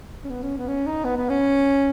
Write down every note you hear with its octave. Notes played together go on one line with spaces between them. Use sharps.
C#4
B3
C#4
B3
C#4
D#4
B3
B3
C#4